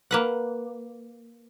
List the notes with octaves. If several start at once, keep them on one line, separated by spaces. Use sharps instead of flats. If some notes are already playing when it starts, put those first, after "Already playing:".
A#3 B4 F#5